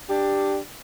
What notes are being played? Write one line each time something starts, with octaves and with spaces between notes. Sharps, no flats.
D4 G4